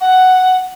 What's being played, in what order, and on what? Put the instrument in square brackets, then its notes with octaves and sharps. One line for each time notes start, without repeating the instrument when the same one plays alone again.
[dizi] F#5